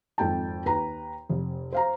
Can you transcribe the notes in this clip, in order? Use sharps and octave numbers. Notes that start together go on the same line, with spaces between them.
G#1 F2 G5 A5
D#2 B4 A#5
F1
C5 F5 A#5